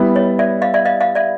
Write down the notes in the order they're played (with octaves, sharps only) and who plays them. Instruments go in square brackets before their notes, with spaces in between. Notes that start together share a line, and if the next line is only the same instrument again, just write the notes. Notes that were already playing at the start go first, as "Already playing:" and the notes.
Already playing: [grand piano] G3 B3 E4
[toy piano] C#5 D#5
D5 E5
D#5 F5
D5 E5
D#5 F5
D#5 F5
D5 E5